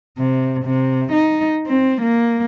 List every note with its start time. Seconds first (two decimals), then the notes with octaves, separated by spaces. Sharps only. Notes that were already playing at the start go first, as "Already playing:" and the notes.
0.18 C3
0.65 C3
1.12 D#4
1.67 C4
2.02 A#3